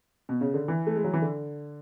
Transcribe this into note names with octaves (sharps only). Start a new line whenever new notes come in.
B2
C#3
D3
E3
A3
G#3
F#3
E3
D3